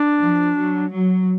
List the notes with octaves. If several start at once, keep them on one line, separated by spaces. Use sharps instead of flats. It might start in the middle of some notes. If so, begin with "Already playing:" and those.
Already playing: D4
F3
F#3
F#3